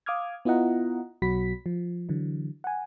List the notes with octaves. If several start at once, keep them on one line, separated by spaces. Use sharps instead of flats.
F5 D6 D#6 F6 G#6
B3 E4 F4 D#5 F#5 A#5
B1 B2 F#3 F#4 B5 B6
F3
D3 E3 F#3
F#5 G#5